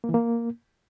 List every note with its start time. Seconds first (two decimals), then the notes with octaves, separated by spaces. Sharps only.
0.04 A#3
0.09 E3
0.14 A#3